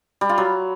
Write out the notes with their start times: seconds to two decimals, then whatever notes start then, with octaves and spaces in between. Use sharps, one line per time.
0.21 G3
0.29 F4
0.38 F#3